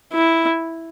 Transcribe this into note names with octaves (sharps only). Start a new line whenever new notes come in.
E4